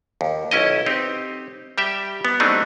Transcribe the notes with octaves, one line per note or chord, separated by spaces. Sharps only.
D#2
B1 C#4 E4 D#5
C4 D#4 G4
G3 G4 E5 G5
B3
F#3 G3 A3 C4 D4 D#4